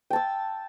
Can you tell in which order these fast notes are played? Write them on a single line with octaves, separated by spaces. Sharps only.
G5 A5 E6